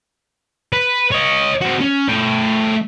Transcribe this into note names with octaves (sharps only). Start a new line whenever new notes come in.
B4
C#5 D#5
C4 F#4
C#4
A3 G5